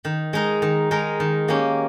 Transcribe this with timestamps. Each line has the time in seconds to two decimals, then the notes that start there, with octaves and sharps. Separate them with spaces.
0.05 D#3
0.33 G#3 D#4 A#4
0.62 D#3
0.91 G#3 D#4 A#4
1.20 D#3
1.48 A#3 C#4 G4